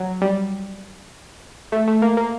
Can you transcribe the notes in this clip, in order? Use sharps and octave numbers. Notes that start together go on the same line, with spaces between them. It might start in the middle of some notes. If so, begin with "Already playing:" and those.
Already playing: F#3
G3
A3
A3
A#3
A#3